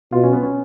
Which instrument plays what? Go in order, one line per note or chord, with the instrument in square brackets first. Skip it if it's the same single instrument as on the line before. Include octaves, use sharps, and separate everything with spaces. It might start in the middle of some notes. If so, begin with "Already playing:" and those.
[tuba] B2 [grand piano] F4
[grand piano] C#4
B3
C#4